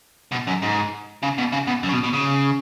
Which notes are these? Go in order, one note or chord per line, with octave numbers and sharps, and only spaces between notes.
B2
F#2
G#2
C#3
B2
C#3
B2
F#2
C#3
B2
B2
C#3